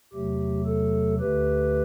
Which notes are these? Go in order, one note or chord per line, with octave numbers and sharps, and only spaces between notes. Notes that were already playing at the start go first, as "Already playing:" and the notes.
E2 C3 F#3 A3 G4
A4
D2 D3 A3 G4 B4